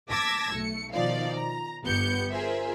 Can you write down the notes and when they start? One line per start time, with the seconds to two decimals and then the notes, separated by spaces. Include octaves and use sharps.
0.10 A5 D6 E6 G#6 A#6 B6
0.54 B1 A3 C#7
0.93 B2 D#3 F3 D#4 D5 F5
1.34 A#5
1.84 G1 B3 G4 G6 C#7
2.30 F4 G#4 A#4 C5 E5